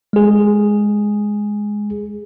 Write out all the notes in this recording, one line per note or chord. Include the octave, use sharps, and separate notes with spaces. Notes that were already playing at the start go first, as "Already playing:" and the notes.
G#3 G#4